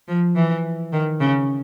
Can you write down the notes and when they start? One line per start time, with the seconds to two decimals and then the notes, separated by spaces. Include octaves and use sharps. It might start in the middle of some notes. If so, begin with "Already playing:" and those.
0.08 F3
0.36 E3
0.93 D#3
1.20 C#3